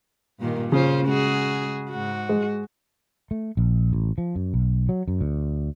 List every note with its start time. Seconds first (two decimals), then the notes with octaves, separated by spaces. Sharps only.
0.39 G2 A#2 D#3
0.72 C#3 C#4 F4 C5
1.06 G#3 F#4 G#4
1.90 G#2 F#4
2.29 G#3
3.31 A3
3.57 A#1
3.93 A1
4.18 F3
4.36 F#2
4.54 B1
4.89 F#3
5.08 F#2
5.21 D2